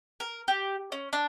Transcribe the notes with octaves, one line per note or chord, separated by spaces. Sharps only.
A#4
G4
C#4
D4